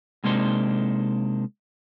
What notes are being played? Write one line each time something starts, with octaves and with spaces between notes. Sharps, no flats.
C3 G#3 A#3 D4 D#4 C5